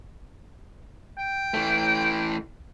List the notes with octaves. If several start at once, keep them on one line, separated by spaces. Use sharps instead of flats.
G5
E3 A3